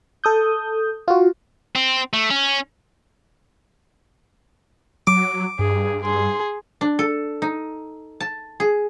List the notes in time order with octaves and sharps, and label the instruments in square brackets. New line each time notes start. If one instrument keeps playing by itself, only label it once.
[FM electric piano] A4 D#6 G6
F4 F#4
[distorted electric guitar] C4
A3
C#4
[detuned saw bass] F#3 [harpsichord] D6
[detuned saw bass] G2 [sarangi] G#4
[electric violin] G#4 [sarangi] C6
[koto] D4
A4
D#4
A5
G#4